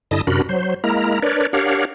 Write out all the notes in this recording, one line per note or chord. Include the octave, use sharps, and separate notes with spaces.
G2 D3 E4 D#5 A5 D#6
F#2 C3 D4 F#4 A#4 B5
F#3 C5
G#3 A#3 E4 A#4 A#5
D4 A#4 B4 C#5 D5
D4 G4 A#4 C#5 F5 F#5